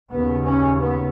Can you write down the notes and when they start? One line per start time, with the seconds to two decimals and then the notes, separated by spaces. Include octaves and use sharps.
0.11 D#2 C#3 B3
0.45 C#4
0.80 B3